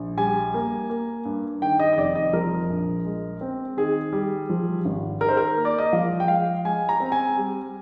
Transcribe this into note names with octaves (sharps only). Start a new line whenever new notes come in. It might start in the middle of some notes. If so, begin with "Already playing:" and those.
Already playing: A#1
G3 G#5
A#3
A#3
G2
D#3 G5
D#5
D#5
F1 D5
D#5
F3 A#4
A#1
G#3
C4
D#3 G#4
G3
F3
G#1
D#3 A#4
C5
A#4
A#3
D5
D#5
F3 F5
G5
G#3 F5
G#3 G#5
A#5
C4
G#5
G3